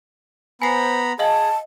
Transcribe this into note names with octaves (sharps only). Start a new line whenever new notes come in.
B3 C5 G#5 A#5 B5 C7
G#4 D#5 F5 A5 F#7